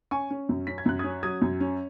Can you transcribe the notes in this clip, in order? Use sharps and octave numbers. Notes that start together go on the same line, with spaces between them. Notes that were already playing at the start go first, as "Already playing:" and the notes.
C#4 G#5 C#6
C#4
F#2
C#4 B6
G#6
F#2 F#6
D#6 G#6
C#4
F#3 D#6 G#6
F#2
C#4